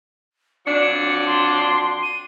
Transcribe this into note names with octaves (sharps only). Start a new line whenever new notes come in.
F2 F#3 D4 C#7
C6
D#7